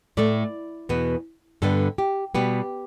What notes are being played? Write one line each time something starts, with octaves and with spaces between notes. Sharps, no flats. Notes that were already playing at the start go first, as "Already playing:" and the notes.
A2 A3 D5
E2 B2 B3
G2 D3 B3 A4
G4
B2 G3 B3 G4